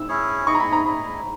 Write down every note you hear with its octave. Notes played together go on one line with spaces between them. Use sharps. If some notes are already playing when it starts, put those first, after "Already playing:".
Already playing: E6
C#4 E4 G#4 C#5
E4 G#4 D#5 C#6
A#5
B5
A#5
E4 G#4 D#5 B5